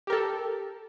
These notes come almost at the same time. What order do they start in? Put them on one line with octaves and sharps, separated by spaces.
G4 A#4 A4